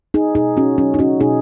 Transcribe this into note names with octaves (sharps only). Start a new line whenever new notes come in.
D#4 G#4
B2 D#4 G#4
C#4 F#4
F#3 C#4
D#4
C#4 F#4
B2 D#4 G#4